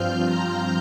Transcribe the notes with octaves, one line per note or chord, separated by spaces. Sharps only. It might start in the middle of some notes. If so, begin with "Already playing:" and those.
Already playing: G2 F3 C4 F4 F6 G6
A#5